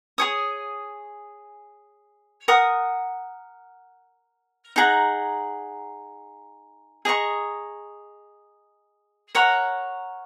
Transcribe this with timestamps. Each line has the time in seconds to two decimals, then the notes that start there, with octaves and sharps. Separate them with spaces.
0.18 G#4 C#5 G#5 D#6
2.48 A#4 F#5 D#6
4.76 D#4 G#4 F#5 A#5
7.05 G#4 D#5 A#5 C#6
9.35 A#4 C#5 F#5 A#5